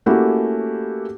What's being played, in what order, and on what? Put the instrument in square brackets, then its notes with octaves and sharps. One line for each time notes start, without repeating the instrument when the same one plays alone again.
[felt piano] A3 A#3 C#4 E4 F#4 G4